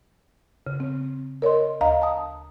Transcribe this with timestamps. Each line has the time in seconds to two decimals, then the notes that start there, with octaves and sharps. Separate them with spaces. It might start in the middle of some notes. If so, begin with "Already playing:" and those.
0.67 C#3
0.80 C4
1.42 A#4 C#5 D#5 C6
1.81 D2 D#5 F5 A#5
2.02 A5 D#6